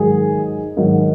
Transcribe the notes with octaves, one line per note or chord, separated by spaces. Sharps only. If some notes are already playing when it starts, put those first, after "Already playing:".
Already playing: G#2 D#3 F#3 G#4
G#2 D#3 F#3